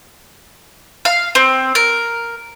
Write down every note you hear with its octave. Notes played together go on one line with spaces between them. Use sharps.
F5
C4
A#4